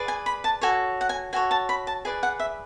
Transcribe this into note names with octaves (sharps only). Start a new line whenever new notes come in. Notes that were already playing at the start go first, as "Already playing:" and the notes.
Already playing: G#4 B4 D5
G#5
B5
A5
F#4 A4 C#5 G#5
F#5
G#5
F#4 A4 C#5 G#5
A5
B5
A5
G#4 B4 D5 G#5
F#5
E5